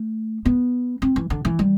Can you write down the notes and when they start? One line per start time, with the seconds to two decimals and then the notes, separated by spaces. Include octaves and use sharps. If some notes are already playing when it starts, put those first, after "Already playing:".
Already playing: A3
0.45 B3
1.02 C4
1.16 E3
1.30 D3
1.45 E3
1.59 G3